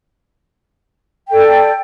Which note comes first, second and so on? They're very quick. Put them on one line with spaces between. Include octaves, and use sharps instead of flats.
G5 A4 D5